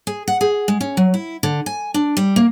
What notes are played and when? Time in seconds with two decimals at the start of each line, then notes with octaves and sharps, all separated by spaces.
0.07 G#4
0.28 F#5
0.41 G#4
0.68 G#3
0.81 C#4
0.97 F#3
1.14 E4
1.43 D3
1.66 G#5
1.94 D4
2.17 G3
2.36 A#3